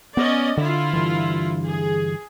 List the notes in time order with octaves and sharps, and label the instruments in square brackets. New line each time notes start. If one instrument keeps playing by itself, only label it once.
[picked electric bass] B3 [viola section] C#4 D5 D#5
[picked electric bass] D3 [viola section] E4 F4
[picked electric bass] G2 D3 E3
[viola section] G#4